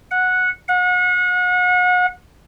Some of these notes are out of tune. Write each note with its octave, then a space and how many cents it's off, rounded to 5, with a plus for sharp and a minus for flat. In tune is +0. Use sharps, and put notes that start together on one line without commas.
F#5 -10
F#5 -35